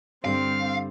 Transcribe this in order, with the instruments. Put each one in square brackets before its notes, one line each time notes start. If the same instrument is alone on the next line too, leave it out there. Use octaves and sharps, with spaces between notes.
[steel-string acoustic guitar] G2 D3 G3 [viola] C4 [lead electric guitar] F5